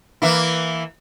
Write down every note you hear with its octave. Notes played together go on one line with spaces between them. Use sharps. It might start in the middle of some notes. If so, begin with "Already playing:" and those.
E3 A#3 E4